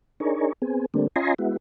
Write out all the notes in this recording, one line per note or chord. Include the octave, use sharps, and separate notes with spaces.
D4 D#4 G#4 A#4 C#5
B3 C4 G#4
D3 G3 A3 A#3 C4 D4
C#4 F4 D#5 G#5 A#5 C6
G#3 B3 E4 F#4